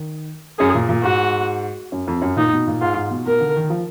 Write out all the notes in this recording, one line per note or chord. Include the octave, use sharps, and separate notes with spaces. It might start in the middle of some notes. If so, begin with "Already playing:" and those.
Already playing: D#3
F#2 G#4
A#2
A#2
G#2 F#4
F#2
F2
F#2
A#2 D#4
B2
A#2
G#2 F4
G#2
B2
B2 A#4
D3
D#3
F3